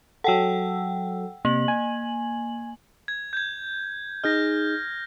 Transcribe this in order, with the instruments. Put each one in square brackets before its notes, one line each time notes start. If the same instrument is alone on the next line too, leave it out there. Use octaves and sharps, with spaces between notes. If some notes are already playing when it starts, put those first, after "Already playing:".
[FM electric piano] F#3 A4 [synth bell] F#5 G5 E6
[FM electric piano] C3 [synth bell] A#3 F#7
[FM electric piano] G#5
[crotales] G#6
G6 G#6
[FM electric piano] D#4 G#4 D#5 [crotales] F6 G6 A#6